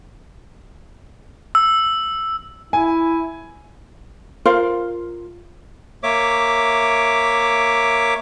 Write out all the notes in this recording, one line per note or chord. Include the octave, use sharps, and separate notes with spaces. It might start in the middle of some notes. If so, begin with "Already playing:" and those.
E6
E4 G#5
F4 A#4 C5 F5
A#3 C#5 E5 D6